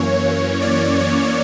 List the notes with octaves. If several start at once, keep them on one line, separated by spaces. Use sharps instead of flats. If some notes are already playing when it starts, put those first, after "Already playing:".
Already playing: F#2 E3 A#3 C#4 C#5
D5
C#5